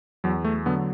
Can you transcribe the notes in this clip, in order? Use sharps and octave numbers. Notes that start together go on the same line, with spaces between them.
E2 F#3
A3
D3 F#3 B3